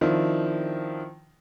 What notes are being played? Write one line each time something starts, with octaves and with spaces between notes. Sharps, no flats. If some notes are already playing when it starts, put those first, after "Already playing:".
D#3 F3 C4 D4 E4